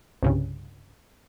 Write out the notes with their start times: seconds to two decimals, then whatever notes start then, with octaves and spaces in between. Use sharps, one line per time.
0.23 C2 G2 C#3